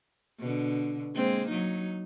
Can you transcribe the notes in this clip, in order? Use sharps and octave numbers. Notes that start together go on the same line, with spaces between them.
B2 D3
G#3 A#3 C4
F#3 D#4